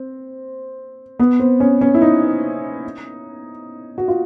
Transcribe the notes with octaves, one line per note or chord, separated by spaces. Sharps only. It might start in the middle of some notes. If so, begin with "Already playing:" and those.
Already playing: C4
B3
C4
C#4
C#4
E4
D#4
F#4
F4